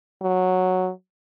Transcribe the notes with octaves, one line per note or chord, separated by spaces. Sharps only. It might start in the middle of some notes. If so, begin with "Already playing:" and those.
F#3